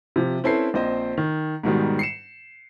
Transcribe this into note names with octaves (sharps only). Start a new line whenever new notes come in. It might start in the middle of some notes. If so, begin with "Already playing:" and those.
C3 F3
C4 C#4 E4 A4 B4 C7
A#1 C4 C5 D#5
D#3
G#2 B2 D#3 G3
C7 C#7 E7